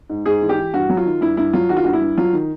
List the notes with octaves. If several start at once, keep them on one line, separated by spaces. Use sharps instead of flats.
G#2
G#2 G#4
E3
G4
E3
G2 F#4
F#3
F4
D#3
G2 E4
G2 E4
F#3 F4
D#3 F#4
F4
G2 F#4
E4
G2
F#3 F4
D#3